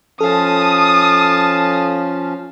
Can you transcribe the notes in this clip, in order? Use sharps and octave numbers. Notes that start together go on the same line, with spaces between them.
F3 C#4 A4 F5 A5 D#6